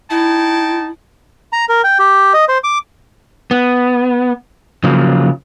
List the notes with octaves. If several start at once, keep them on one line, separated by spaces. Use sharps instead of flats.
D#4 E4 G5 A5
A#5
A#4
G5
G4
D#5
C5
D6
B3
C#3 F3 F#3 A#3